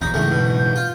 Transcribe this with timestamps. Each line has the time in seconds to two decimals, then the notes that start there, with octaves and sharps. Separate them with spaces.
0.01 A#1 E2 D#4 G6
0.14 F#1 C#2 G#2 E3 A3
0.32 B2
0.59 G6
0.76 F4